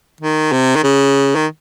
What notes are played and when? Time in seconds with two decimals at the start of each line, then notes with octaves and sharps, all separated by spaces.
0.21 D#3
0.52 C3
0.76 D#3
0.84 C#3
1.36 D#3